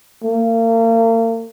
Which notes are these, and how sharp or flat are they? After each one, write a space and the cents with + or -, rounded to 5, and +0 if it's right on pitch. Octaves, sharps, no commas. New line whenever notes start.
A#3 -40